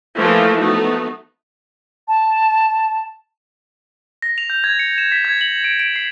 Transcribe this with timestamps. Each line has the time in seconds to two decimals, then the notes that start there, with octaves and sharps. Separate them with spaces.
0.17 E3 F3 A3 A#3 E4 F4
0.59 A3 B3 D#4 F#4
2.08 A5
4.22 A#6
4.38 F7
4.50 G6
4.64 G#6
4.79 C#7
4.98 E7
5.12 B6
5.25 G#6
5.41 F#7
5.64 D7
5.79 D7
5.96 C7